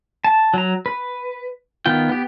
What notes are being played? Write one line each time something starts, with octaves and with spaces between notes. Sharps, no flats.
A5
F#3 A#5
B4
D#3 B3 F4 G5
B3 G4